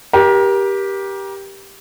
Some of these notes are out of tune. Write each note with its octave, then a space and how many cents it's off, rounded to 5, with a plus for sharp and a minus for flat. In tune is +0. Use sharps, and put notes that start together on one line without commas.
G4 +0 A#4 +30